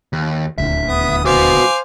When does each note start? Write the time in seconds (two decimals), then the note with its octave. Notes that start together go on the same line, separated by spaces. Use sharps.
0.13 D#2
0.58 D#1 D2 D3 E5
0.88 B3 D#6
1.25 F#4 B4 C5 F5 G#5 D6